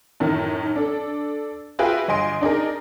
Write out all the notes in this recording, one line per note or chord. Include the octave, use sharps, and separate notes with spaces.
F#2 A2 D#3
D4 A4
F4 F#4 G#4 B4 E5 G5
G1 D#5 G#5 C6 D7
D4 D#4 G#4 A#4